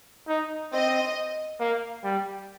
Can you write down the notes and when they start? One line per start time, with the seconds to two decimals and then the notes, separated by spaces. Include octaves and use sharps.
0.28 D#4
0.72 C4 D#5
1.60 A#3
2.03 G3